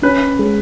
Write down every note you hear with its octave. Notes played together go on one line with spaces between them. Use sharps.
C#4 B4
G#3